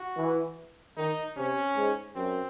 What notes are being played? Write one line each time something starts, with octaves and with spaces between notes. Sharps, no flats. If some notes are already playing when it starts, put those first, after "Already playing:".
Already playing: F#4
E3
D#3 D#4
C3 C#4
G#2
F#2 C4